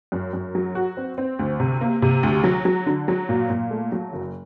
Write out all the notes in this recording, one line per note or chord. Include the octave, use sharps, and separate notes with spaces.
F#2
F#2
F#3
F#4
C4
C4
D2
C3
A#3
C3
D2
F#3
F#3
D3
F#3
A#2
A#2
A3
F#3
F#1